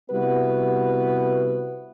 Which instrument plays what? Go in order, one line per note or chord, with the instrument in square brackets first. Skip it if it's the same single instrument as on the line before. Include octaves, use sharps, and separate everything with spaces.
[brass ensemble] C3 G3 B3 E4 F#4 B4